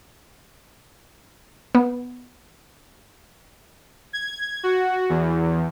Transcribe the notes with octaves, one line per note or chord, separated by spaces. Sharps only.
B3
G#6
F#4
E2